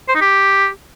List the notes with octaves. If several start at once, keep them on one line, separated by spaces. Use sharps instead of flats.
C5
D#4
G4